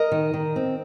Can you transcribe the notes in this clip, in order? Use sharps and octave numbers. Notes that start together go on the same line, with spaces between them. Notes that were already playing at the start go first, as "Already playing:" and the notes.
Already playing: A#4 D#5
D#3
D#3
C4